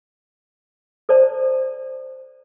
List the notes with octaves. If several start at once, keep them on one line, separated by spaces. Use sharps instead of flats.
A4 C5 D5 A5